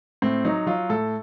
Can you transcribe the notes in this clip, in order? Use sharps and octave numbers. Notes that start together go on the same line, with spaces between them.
A2 C4
F#3 D#4
F#3 F4
A2 A4